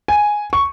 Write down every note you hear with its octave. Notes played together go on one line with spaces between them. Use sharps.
G#5
C#6